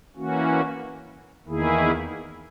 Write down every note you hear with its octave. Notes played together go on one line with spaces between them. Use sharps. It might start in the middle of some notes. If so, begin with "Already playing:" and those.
E3 A#3 C#4 F#4
E2 D#3 A#3 E4 G#4